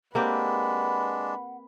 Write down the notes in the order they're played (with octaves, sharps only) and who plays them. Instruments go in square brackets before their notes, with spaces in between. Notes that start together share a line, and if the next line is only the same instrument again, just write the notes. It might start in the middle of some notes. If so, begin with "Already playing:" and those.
[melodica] G#3 D4 [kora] A#3 C4 G4 [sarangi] B4 [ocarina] F#5